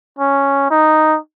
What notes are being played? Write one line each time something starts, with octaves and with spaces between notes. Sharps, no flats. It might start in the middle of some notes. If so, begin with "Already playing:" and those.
C#4
D#4